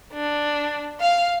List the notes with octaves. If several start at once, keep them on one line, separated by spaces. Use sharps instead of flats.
D4
F5